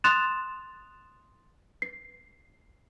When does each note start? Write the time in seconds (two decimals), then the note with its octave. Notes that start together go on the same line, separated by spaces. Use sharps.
0.04 C6 D#6 F#6 A6 E7 F7
1.82 C7